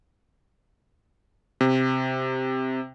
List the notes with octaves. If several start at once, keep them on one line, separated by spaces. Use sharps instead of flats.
C3